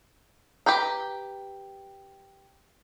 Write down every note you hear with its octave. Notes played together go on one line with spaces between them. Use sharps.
G4 B4 G5 A#5